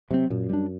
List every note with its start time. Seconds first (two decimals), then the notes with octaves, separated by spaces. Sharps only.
0.11 C3 F#3 A3 C4
0.30 F#2 A#2
0.49 G3 D4